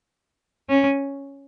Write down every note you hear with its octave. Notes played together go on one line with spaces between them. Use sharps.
C#4